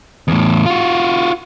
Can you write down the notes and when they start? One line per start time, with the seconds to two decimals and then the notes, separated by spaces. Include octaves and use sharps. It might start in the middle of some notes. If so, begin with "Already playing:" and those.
0.28 E2 A2
0.66 F4 F#4